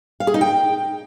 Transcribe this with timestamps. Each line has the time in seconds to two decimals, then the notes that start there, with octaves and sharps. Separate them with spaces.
0.20 F5
0.27 G#4
0.34 D#4
0.41 G5